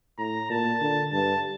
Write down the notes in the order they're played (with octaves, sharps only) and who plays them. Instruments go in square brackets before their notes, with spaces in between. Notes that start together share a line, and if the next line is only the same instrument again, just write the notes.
[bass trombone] A2 [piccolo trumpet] A#5
[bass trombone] A#2 [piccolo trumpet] A5
[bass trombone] D3
[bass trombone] G2 [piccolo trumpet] A5